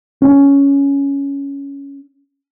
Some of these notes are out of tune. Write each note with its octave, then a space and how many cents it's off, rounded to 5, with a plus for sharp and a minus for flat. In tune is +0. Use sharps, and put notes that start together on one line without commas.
C#4 +10